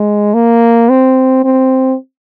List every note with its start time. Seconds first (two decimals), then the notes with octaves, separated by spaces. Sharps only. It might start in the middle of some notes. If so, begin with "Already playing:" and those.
Already playing: G#3
0.34 A#3
0.89 C4
1.44 C4